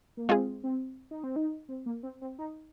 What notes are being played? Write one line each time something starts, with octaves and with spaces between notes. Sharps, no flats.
A#3
G#3 C4 F4 G#4
C4
D#4
C4
D#4
C4
A#3
C4
C4
D#4